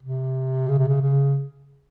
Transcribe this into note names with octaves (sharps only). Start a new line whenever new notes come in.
C3
C#3
C3
C#3
C#3